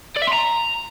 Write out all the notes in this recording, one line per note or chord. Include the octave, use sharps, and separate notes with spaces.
D5
E5
C6
A#5